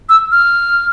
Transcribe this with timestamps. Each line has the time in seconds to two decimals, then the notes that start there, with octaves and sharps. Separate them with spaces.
0.09 E6
0.32 F6